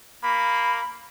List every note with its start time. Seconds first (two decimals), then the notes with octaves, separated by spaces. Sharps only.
0.23 A#3 B5